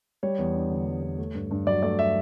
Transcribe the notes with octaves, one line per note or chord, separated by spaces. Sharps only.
G3 C#5
E2
D4
D3
G3
E2
A3
G2
G2
F#3 D5
A3 D5
E5